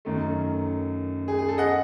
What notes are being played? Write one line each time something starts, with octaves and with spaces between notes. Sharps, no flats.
F#2 D#3 A3
G#4
G#4
A4
D#5 F#5